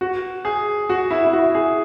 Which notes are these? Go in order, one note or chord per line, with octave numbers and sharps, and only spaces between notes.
F#4
G#4
F#4
E4
E4
F#4
G#4